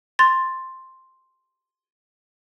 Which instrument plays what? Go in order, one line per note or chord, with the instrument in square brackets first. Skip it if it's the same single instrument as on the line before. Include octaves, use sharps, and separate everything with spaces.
[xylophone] C6 A6